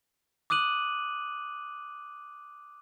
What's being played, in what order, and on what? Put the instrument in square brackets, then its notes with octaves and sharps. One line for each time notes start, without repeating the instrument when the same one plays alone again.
[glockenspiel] D6 D#6 F#6 D#7 F#7